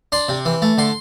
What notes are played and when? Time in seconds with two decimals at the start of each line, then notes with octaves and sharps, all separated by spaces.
0.12 D4 C6
0.29 C3
0.45 E3
0.62 A3
0.78 D3 C6